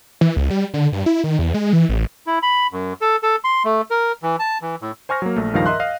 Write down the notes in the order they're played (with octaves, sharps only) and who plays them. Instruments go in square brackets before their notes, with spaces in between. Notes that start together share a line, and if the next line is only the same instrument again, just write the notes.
[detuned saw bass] E3
C#2
G3
D3
G2
E4
D#3
E2
G#3
E3
A1
[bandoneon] E4
B5
F#2
A4
A4
C6
A3
A#4
E3
A5
E3
A2
[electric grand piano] C5 G#5 C#6 F6 A#6
F#3 A#3
A#1 A3
C#2 G2 D#3 F3 F5 A#6
A#4 D#5 E5 C6 F#6
D#5 F5